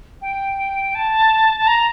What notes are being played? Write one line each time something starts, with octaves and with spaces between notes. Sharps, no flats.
G5
A5
A5
A#5